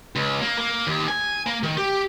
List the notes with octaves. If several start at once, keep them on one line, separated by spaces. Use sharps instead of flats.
C#2
A#3
A#3
D#2
G#5
A#3
D#3
G4